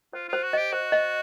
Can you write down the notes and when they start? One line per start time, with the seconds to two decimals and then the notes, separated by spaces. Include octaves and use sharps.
0.13 F4 C5
0.29 F4 C5
0.43 F#4
0.53 G4 D#5
0.72 F#4 C5
0.92 D#5